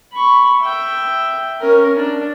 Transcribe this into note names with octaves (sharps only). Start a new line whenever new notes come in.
B5 C#6
E5 G5
C#4 A#4
D4